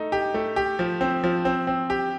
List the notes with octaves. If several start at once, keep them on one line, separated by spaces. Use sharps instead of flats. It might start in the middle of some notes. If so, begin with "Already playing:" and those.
Already playing: A3 D#4
G4
A3
G4
F3
C4
F3
C4
C4
G4